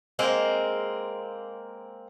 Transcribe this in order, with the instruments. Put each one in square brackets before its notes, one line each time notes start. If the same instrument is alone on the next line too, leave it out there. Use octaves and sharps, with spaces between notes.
[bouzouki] G#3 A#3 C4